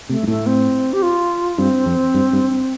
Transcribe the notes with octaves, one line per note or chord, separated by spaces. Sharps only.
C3 A3
G2
A2 A3
C4
G4
F4
G2 C4
F2
G2
G2